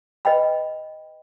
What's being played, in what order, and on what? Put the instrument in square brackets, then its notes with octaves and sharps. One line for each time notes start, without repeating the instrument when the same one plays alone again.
[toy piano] B4 D#5 G5 B5